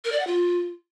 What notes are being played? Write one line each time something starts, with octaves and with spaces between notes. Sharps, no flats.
A#4
D5
F#5
F4